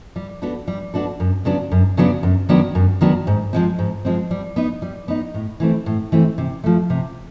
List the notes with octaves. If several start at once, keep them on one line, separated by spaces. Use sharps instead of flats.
G3
B3 D4 F#4 A4
G3
B3 D4 F#4 A4
F#2
C#3 F#3 B3 D4
F#2
C#3 F#3 B3 D4
F#2
D#3 F#3 B3 D4
F#2
D#3 F#3 B3 D4
G#2
F3 G#3 C4
G#2
F3 G#3 C4
G3
B3 D#4
G3
B3 D#4
A2
E3 A3 C4
A2
E3 A3 C4
C3
F3 A3
C3